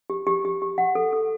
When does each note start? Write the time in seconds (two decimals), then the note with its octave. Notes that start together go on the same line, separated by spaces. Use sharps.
0.10 G4
0.27 G4
0.45 G4
0.62 G4
0.78 F#5
0.95 A4
1.13 A4